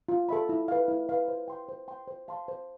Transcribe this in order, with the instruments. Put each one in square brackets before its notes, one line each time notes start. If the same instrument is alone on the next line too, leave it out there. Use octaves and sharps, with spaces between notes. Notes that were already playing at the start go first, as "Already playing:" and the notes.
[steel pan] F4
A4 E5 B5
E4
B4 F5
E4
B4 F5
C5
G5 C6
C5
G5 C6
C5
F5 A5 C6
C5